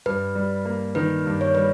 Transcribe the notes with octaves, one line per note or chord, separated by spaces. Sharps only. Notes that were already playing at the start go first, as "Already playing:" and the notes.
G2 B4
G3
A#3
D#3 B4
G2
C#5
G3 B4